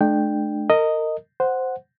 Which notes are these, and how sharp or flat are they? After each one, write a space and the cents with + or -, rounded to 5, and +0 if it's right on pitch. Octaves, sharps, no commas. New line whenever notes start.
A3 -35 D4 +30 G5 +0
A#4 -30 D#5 +0
C5 -5 F#5 +0